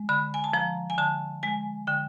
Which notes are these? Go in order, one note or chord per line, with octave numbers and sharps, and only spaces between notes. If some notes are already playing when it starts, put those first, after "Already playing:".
Already playing: G#3
D3 B5
G#5
A5
F3 A#5
G#5
D3 A5
G#3 G#5
D3 G5